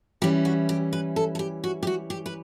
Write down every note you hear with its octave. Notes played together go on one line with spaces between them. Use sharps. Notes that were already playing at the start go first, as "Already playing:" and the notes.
E3 G3 C#4 E4 G4
F#4
G4
B4
A4
A4
G4
F#4
G4
F#4
G4
B4